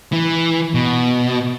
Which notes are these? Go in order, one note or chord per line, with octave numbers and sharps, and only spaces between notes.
E3
B2